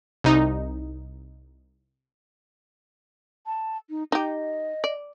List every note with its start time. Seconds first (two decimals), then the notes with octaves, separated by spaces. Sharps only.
0.24 C2 D#4
3.46 A5
3.90 D#4
4.12 D#4 G4 D#5
4.84 D5